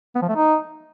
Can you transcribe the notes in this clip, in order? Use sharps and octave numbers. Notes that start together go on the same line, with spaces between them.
B3
F3
A3
D#4